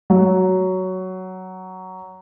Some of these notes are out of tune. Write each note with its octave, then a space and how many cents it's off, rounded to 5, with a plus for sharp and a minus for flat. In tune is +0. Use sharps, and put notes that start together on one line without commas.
F#3 +10